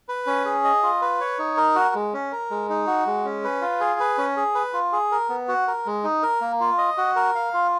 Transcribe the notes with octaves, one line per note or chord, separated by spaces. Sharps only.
B4
C#4
G#4
D#5
F4
B4
C#5
D#4
A#4
F#4
G#3
C#4
A#4
G#3
D#4
F#4
G#3
C#4
B4
F4
G#4
B4
C#4
G#4
B4
F4
G#4
A#4
B3
F#4
A#4
G#3
D#4
A#4
A#3
F4
D#5
F#4
A#4
F5
F4